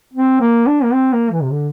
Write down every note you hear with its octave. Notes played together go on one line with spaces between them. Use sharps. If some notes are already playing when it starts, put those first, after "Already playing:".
C4
A#3
D4
A#3
C4
A#3
E3
C3
D3